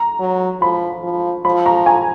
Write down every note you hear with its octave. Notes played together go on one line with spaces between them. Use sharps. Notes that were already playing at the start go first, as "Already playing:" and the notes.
Already playing: A#5
F#3
F3 B5
F3
F3 B5
A#5
G#5